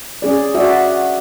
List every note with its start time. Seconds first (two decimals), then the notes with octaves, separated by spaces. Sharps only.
0.22 C#4 G#4 D5
0.55 F#4 D5 E5